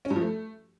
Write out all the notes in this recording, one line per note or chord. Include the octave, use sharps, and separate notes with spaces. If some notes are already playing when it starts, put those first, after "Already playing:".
C#4
G2
F3
A3